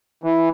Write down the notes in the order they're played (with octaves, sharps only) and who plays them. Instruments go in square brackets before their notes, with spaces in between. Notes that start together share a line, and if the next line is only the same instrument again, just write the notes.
[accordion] E3